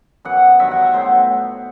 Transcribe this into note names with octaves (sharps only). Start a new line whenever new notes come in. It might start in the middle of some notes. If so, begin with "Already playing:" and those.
F#2 E3 B3 F#5
G2 D#3 F#3 E5
F#5
E5
A2 F#3 B3 C5